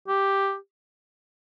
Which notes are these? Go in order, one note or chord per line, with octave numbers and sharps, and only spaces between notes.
G4